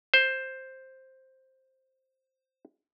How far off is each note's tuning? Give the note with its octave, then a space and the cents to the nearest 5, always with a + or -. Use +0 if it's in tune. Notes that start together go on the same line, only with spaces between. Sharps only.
C5 +5